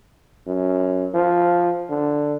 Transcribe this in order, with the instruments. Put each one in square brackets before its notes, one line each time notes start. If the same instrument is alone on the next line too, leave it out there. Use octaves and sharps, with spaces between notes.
[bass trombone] F#2
F3
D3